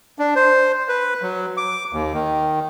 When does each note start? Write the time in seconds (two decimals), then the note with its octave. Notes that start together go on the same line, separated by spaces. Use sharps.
0.19 D4
0.35 C5
0.89 B4
1.22 F#3
1.57 D6
1.93 D#2
2.14 D#3